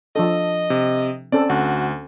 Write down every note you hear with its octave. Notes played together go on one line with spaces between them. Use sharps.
F3 D4 A4 D#5
C3
C4 C#4 A4 D5
D2 F#4